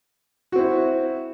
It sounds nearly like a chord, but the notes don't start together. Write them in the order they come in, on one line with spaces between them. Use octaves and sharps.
F#4 C4 E4